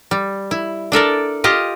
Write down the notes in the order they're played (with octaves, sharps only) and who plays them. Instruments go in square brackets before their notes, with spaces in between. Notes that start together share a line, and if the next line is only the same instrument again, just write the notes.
[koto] G3
E4
D4 A4 A#4 D5
F4 G4 D#5